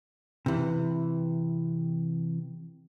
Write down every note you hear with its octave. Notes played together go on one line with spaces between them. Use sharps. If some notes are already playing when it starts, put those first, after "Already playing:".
C3 E3